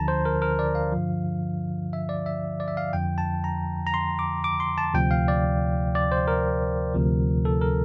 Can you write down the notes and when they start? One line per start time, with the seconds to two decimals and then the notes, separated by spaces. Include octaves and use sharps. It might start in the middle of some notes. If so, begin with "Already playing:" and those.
Already playing: D2 D3 F3 A5 A#5
0.08 C5
0.25 A#4
0.42 A#4
0.59 D5
0.75 F5
0.92 G2 D3 F3
1.93 E5
2.09 D5
2.26 E5
2.60 D5
2.68 E5
2.77 F5
2.93 F2 D3 F3 G5
3.18 A5
3.44 A#5
3.87 A#5
3.94 C6
4.19 D6
4.44 D6
4.60 C6
4.78 A5
4.94 D2 C3 F3 G5
5.11 F5
5.28 D5
5.95 D5
6.12 C5
6.28 A#4
6.94 D2 C3 F3
7.45 A4
7.61 A#4